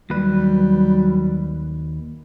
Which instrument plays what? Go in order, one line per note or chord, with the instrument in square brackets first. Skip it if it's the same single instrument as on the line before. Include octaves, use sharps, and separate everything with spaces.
[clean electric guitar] D#2 B4 [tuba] F#3 [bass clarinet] G3